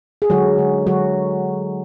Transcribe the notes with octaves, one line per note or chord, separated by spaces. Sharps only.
G#4
D3 F#3 G#3 F#4
D3 G#3
D3 F#3 G#3 F#4